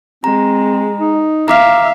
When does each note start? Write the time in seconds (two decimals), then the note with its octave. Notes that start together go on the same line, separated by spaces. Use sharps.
0.24 G#3 C4 A#5
1.00 D#4
1.48 E5 F5 A#5 D6 F6